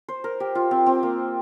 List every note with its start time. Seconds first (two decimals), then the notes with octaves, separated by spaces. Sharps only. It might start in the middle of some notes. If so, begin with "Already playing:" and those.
0.08 C5
0.24 A#4
0.40 G4
0.55 F4
0.71 C4
0.86 C4
1.03 A#3